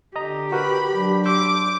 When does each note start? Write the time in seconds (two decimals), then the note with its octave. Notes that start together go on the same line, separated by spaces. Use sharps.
0.16 D3 G4 D#5 A#5
0.52 F#4 A#4 B4 B5
0.94 F#3 D4
1.26 C6 D6 E6 G6